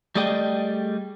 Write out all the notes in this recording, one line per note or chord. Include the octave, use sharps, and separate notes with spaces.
G3 A3 G#4 D5 D#5 G5